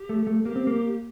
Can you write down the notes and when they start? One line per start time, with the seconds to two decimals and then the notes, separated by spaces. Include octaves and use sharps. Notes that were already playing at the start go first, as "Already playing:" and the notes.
Already playing: G4
0.09 A3
0.27 A3
0.45 A#3 G4
0.56 C4
0.67 A#3